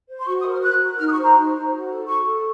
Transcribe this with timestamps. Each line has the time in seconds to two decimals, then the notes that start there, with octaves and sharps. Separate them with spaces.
0.09 C5
0.19 C6
0.27 F#4 C#6
0.39 D#6
0.46 A#4
0.52 F6
0.63 A#4 F#6
0.81 F#4
0.99 D#4 F6
1.08 D#6
1.12 C#6
1.18 C5
1.23 A#5
1.35 D#4
1.54 C5
1.72 F#4
1.89 A4
2.07 A4 C#6
2.26 A4